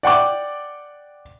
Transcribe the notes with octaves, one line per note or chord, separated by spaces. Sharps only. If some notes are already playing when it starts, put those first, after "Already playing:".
D5 F#5 G5 D6